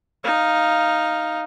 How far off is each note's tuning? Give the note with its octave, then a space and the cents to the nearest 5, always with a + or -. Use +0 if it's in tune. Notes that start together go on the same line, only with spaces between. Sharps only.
D#4 +0 F5 +0